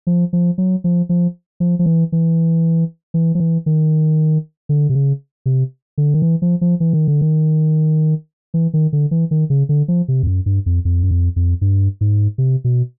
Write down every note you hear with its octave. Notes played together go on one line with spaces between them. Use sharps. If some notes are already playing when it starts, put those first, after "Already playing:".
F3
F3
F#3
F3
F3
F3
F3
E3
E3
E3
F3
E3
D#3
D3
C3
C#3
C3
D3
D#3
E3
F3
F3
E3
D#3
D3
D#3
E3
D#3
D3
E3
D#3
C#3
D3
F3
C3
F2
F#2
G2
F2
F2
F#2
F2
F2
G2
G#2
C3
B2